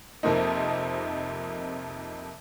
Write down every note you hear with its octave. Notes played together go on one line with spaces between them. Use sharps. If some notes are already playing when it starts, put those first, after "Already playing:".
F2 C3 F3 A#3 C4 D#4